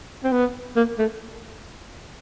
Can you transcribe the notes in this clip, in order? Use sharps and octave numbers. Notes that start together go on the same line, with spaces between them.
C4
B3
A#3
A3